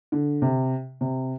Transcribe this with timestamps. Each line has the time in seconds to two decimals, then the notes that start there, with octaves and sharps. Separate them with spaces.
0.12 D3
0.42 C3
1.01 C3